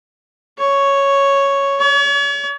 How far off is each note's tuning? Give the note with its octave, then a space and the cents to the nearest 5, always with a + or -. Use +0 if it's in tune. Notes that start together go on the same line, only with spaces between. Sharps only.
C#5 +0
C#5 +40